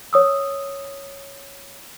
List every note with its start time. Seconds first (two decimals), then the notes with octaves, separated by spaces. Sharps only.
0.13 C#5 D#6 E6